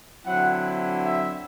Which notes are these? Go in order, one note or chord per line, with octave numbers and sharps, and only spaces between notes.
D3 F#3 C4 E4 F#5
E5